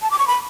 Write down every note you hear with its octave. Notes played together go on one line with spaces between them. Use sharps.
A5
D6
C#6
B5